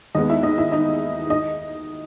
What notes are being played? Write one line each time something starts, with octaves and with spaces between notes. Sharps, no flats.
D#2 D#3 G#3 B3 D#4 D#5
E4 E5
D#4 D#5
E4 E5
D#4 D#5
D#4 D#5